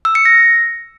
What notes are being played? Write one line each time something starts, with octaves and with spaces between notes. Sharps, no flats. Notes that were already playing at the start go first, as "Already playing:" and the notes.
E6
C#7
A#6